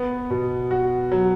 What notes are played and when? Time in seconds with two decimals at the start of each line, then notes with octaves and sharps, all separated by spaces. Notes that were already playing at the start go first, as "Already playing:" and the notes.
Already playing: B3
0.30 B2
0.71 F#4
1.12 F#3